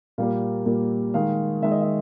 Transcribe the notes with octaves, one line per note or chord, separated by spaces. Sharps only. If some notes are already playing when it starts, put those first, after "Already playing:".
A#2 G3 A#3 F5
A#2 G3 A#3
D#3 G#3 F5
D#3 G#3 E5
D#5
E5